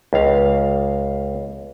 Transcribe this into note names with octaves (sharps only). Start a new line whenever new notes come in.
C#2 F5